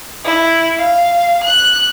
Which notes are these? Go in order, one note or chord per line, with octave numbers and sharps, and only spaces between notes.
E4
F5
F#6